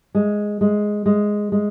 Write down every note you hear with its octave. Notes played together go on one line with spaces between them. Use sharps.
G#3
G#3
G#3
G#3